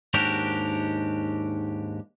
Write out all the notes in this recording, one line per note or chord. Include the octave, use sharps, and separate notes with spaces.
D#2 G#2 D4 F#4 G4 A#4